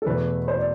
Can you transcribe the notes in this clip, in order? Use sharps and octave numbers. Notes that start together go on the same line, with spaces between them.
A4
E2 B2 A3 B4
C5
D5